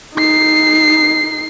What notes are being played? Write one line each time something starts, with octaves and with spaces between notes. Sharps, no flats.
D#4 C7